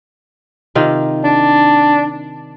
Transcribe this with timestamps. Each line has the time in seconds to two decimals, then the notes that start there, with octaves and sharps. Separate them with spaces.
0.75 C3 D#3 F4
1.24 D4